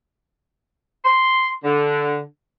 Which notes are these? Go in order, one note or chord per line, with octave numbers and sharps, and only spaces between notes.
C6
D3